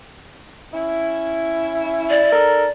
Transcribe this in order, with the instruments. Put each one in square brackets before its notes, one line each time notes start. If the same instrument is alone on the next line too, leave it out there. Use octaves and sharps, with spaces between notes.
[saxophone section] C#4 E4
[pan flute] D5
[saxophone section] D#4 A4 A#4